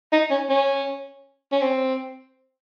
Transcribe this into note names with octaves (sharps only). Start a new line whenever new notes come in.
D#4
C#4
C#4
C#4
C4